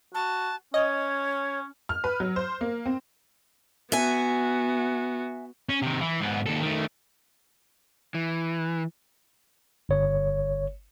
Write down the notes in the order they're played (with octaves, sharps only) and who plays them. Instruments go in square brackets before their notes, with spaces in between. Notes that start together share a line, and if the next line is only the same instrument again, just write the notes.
[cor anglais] F#4 [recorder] A5
[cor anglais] C#4 [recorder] C#5 [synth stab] D#5
[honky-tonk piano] F6
B4
F#3
C5
A#3
C4
[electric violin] B3 F#4 [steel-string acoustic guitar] E5 G#5
[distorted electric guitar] C#4
C3 D#3
E3
G#2 B3
D#2 A4
D#3 A3
[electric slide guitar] E3
[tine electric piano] G1 C#5